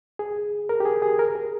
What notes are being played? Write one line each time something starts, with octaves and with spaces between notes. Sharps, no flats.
G#4
A#4
G4
G#4
G#4
A#4
G#4